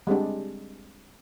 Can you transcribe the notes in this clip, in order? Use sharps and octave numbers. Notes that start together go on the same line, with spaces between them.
G3 G#3 C4 D4